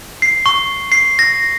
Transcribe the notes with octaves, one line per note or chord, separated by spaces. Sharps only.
C7
C#6
C7
A#6